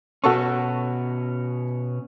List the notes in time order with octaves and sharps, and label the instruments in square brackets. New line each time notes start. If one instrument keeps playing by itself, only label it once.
[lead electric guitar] B2 C#4 [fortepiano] F#4 A4 C#6